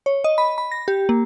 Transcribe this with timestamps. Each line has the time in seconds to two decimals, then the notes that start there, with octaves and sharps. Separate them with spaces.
0.06 C#5
0.24 D#5
0.38 B5
0.58 B5
0.72 A#6
0.88 G4
1.09 A#3